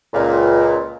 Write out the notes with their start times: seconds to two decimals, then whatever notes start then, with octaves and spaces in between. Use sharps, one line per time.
0.13 C#2 A#2